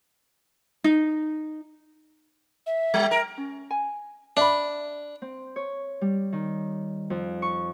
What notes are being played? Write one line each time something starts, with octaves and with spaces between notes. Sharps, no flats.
D#4
E5
G3
A#4
C#4
G#5
D4 E5 B5
C4
C#5
G3
D#3
F2
C#6